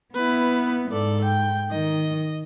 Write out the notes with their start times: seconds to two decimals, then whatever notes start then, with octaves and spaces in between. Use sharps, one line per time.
0.15 B3 E4 B4
0.92 G#2 A4 D5
1.24 G5
1.71 D#3 D#5